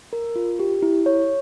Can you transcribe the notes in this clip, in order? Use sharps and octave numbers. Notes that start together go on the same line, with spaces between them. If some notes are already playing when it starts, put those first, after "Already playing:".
A#4
F4
G4
E4
C#5